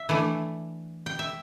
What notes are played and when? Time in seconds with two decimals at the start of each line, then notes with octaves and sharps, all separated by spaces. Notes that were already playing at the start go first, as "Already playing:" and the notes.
Already playing: E5
0.09 E3 A3 D4
1.06 G5
1.19 E5